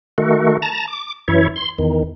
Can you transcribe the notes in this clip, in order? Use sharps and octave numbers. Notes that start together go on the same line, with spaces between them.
D#3 A3 F#4
A5 A#5
D6
F#2 E3 E4 C#5
C6
E2 D#3